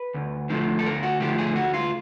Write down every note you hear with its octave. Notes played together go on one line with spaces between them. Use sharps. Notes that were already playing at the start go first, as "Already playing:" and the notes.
Already playing: B4
D2
D3 F3 A3
A4
D2 A#4
F#4
D3 F3 A3 G4
G#4
D2 F#4
F4